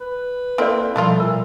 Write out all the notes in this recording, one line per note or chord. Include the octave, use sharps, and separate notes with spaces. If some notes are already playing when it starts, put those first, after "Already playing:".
B4
A#3 C4 E4 A4 D5
B2 F3 G3 A3 E4 F4
A#2 A#4 B5